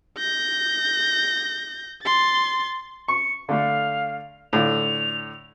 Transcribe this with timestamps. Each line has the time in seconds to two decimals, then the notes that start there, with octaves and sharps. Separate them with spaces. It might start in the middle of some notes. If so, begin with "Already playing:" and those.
0.18 G6 A#6
2.04 C6 A6
3.08 C#6 C#7
3.49 D3 A3 F5
4.53 A2 D3 F4 F7